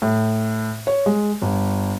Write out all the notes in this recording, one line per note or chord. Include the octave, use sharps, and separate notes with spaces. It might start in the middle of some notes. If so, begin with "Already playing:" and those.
A2
C#5
G#3
G1